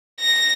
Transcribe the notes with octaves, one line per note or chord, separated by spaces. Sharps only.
A#6